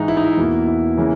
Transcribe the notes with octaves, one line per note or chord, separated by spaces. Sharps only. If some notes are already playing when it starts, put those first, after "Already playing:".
Already playing: G#2 E3 G#3 D#4
E4
D#4
E4
E2 B2 A#3
E4
C#3 E3 A#3